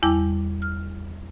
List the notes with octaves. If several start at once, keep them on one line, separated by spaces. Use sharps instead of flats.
E2 G3 E4 G5 A5 D6
F6